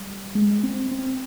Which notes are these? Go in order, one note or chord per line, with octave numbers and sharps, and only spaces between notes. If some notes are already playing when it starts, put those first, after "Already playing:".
Already playing: G3
G#3
C4
C4